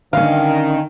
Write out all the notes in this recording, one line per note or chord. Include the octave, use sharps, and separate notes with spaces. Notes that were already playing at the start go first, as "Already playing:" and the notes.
D3 D#3 C#4 D#5 F5